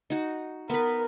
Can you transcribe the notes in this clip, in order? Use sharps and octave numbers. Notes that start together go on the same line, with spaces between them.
D#4 F#4
B3 A#4 B4